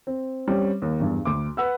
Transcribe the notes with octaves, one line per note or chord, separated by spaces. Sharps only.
C4
G3 C4 C#4
D#2
E2 G2
D2 D6
B4 F#5 E6